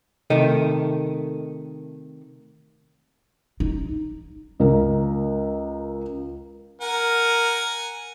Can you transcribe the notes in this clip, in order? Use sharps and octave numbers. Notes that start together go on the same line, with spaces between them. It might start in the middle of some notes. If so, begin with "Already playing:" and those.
C3 D#3 A3 D#5
D#4
C#2 A#4
A#4 F#5 G#5